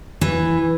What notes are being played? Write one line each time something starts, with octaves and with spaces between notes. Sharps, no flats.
E3